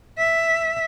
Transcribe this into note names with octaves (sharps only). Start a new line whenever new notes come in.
E5